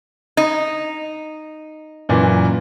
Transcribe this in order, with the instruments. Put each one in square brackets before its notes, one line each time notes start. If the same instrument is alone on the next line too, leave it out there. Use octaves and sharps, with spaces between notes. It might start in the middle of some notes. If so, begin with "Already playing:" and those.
[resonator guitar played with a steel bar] D#4
[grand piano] F#2 A#2 E3